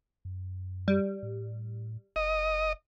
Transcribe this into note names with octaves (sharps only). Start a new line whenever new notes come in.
F#2
G3
A2
F#1 D#5